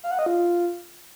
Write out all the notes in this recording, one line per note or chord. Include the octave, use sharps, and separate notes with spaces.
F5
F#5
D#5
F4